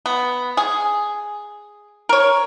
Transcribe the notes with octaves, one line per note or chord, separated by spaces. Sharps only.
B3
G#4
A#4 C#5